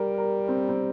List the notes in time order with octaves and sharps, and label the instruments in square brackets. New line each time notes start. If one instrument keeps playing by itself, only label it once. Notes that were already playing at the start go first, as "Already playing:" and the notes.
Already playing: [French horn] G3 [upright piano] A#4
[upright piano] A#4
C4
C4